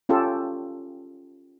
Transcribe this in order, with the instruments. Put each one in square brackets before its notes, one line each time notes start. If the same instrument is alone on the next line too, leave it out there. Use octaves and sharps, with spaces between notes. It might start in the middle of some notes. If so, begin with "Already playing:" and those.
[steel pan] C#4 F4 G4 A4